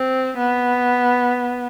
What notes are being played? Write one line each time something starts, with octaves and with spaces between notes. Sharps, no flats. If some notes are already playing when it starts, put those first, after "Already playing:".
Already playing: C4
B3